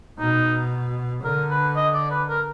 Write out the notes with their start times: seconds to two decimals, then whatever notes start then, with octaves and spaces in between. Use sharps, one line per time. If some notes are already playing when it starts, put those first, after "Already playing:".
0.19 B2 D#4
1.23 D3 A#4
1.50 B4
1.76 D#5
1.94 D5
2.11 B4
2.29 A#4